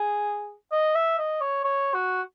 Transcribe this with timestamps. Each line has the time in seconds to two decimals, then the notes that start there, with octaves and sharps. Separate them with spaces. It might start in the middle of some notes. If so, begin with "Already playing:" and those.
Already playing: G#4
0.72 D#5
0.95 E5
1.18 D#5
1.41 C#5
1.64 C#5
1.94 F#4